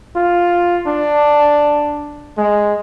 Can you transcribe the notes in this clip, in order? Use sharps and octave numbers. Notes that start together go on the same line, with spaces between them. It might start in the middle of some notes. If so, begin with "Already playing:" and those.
F4
D4
G#3